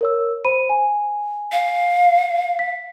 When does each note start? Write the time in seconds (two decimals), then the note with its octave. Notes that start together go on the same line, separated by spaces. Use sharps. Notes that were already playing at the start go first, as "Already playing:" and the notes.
0.01 A#4 C#5 E6
0.45 C5 B5 D#7
0.69 G#5
1.52 F5
2.59 B6